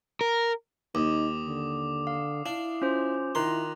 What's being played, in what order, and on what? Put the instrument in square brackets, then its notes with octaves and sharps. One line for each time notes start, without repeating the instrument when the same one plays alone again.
[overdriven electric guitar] A#4
[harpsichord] D#2 [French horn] D#4 [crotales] D6 D#6
[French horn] D3
[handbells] F5
[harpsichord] D4 [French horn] E4 [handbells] F5
[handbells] C#4 F4 C5
[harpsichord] D#3 C6 [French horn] E4 [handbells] F4 A#5 F#6